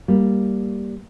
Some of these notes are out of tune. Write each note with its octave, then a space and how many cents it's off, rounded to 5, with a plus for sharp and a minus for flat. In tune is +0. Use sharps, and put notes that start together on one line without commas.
G3 +0 A#3 +0